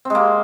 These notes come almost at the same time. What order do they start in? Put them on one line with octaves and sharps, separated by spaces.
C4 G#3 A#3